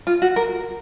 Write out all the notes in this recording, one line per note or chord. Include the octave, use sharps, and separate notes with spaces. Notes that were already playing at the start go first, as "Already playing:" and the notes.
F4
F#4
A#4